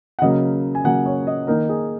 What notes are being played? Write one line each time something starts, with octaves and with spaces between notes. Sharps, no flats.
F#5
C#3 F#3 A#3 D#5
G#5
C#3 F#3 A#3 F#5
C#5
D#5
D#3 A#3 D#4 A#4
G#4